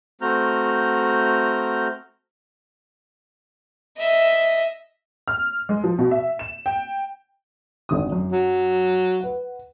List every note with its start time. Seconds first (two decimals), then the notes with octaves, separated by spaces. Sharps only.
0.21 A3 C4 F#4 A#5 F6 G6
3.98 D#5 E5
5.28 F6
5.69 G#3
5.84 F3
5.99 B2
6.11 E5
6.39 E7
6.66 G5
7.89 G#1 D3 D#6
8.12 F#2
8.32 F#3
9.21 B4 F#5